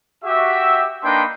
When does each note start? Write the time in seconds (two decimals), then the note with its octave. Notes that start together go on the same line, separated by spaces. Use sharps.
0.24 F#4 G4 E5
1.03 A#3 D4 D#4 B4 G5 C6